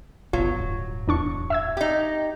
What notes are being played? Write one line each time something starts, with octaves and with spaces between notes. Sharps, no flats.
F#1 C2 B2 F#3 F4
D1 G2
E2 D4 C#6
E5 E6 G#6
D#4 G4